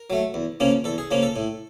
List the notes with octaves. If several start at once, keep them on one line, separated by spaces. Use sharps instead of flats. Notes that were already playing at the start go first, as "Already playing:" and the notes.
Already playing: A#4
F#3 A3
E2
C#3 F3 A#3 C#4
E2 A4
G#4
C#3 F3 A#3 C#4
A4
A2